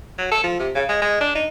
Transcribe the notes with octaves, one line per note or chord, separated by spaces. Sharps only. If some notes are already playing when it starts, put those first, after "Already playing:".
F#3
A4
F3
C3
C#3
G#3
G#3
D4
D#4